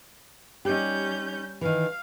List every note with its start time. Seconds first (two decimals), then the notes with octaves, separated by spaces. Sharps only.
0.65 G3 C#4 D#4 G4 G6
1.61 D#3 E3 F5